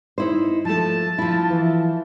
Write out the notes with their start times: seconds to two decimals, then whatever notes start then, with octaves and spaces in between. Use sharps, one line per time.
0.18 D#4 E4 C5
0.65 F3 A3 A5
1.18 F3 E4
1.50 E3